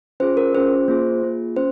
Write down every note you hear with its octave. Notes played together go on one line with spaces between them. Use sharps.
C#4 F4 G#4 C5
A#4
C#4 F4 G#4 C5
A#3 F4 G#4
A#3 F4 G#4
C#4 C5